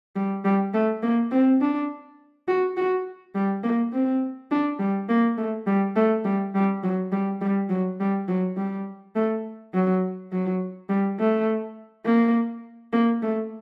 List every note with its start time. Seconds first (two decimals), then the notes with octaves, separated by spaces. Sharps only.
0.16 G3
0.45 G3
0.74 A3
1.03 A#3
1.31 C4
1.61 D4
2.48 F#4
2.77 F#4
3.35 G3
3.64 A#3
3.93 C4
4.51 D4
4.80 G3
5.09 A#3
5.38 A3
5.67 G3
5.96 A3
6.25 G3
6.55 G3
6.84 F#3
7.12 G3
7.41 G3
7.70 F#3
8.00 G3
8.29 F#3
8.57 G3
9.16 A3
9.74 F#3
10.32 F#3
10.90 G3
11.19 A3
12.06 A#3
12.93 A#3
13.22 A3